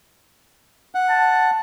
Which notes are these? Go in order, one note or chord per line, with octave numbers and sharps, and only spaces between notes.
F#5
A5